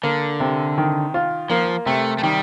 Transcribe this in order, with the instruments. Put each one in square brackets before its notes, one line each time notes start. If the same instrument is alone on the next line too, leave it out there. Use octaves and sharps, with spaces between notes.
[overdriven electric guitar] D3 [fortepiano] A#3
[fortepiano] C3
D#3
F4
[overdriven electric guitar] F3 [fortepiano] A#3
[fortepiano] C3 [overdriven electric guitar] A3
[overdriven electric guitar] A3
[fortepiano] D#3 [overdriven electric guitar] G3